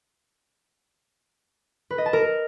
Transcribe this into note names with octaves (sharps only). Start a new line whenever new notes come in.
B4
D#5
A5
A#4